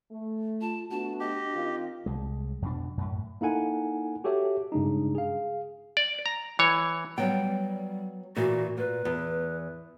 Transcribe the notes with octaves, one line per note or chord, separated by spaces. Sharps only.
A3
F4 A5
A3 B3 D4 F#4 A5
G4 D#5
D#3 C4 F4
C2 G#3
F2 B2 D4
F#2 A2
A#3 D#4 E4 A4 F#5 G#5
F#4 G4 A4 C#5 E5
G2 C#3 G#3 D4 D#4
G#4 F5
D5
A#5
E3 C#5
F#3 G3 B3 G5
A#2 E3 F#4
A#2 B4
E2